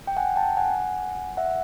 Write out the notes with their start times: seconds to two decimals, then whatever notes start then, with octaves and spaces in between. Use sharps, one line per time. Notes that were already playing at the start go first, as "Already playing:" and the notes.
0.07 G5
0.17 F#5 G#5
0.36 G5 A5
0.57 F#5 G#5
1.37 E5 F#5